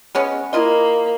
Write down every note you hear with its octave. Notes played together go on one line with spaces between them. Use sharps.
G#3 B3 C#4
A#3 E4 F4 D#5